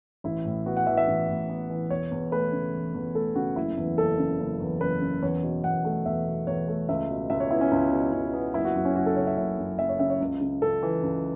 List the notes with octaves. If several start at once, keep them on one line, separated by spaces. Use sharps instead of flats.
A1 E4
A2
B3 F#4
F#5
E3 E5
E5
A1
A2
B3
E3
E1 C#5
E2
A3 B4
C#3
E1
E2
A3 A4
C#3 F#4
F#1 E4
E2
F#1 A4
C#3
F#1
E2
F#1 B4
C#3
E2 C#5
B2
E2 F#5
A3
E2 E5
B2
E2 C#5
A3
C#2 E5
B2
C#2 E5
C#5
B3 E4
C#4
C#2
B2
C#2
B3
F#1 E4
F#4
F#2 F#4
C#4
F#1 F#4
A4
C#3 C#5
E5
F#1 E5
F#2
F#1 E5
C#5
C#3 E5
C#5
C#2
C#3
C#2 A4
E3
C#2